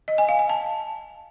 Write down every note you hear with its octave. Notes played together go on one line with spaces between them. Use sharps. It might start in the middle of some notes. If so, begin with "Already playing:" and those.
D#5
G#5
F5
G#5
A5